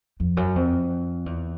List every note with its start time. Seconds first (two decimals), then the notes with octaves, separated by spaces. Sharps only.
0.20 F2
0.37 F#2
0.56 F2
1.26 E2